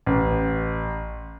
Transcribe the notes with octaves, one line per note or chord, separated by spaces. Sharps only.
A1